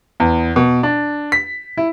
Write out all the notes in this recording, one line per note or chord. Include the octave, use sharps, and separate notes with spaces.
E2
B2
D4
B6
E4